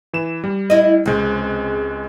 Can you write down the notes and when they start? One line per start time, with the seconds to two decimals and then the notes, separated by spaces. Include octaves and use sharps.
0.13 E3 E7
0.44 G3
0.70 E4 D#5
1.06 C#2 C3 G#3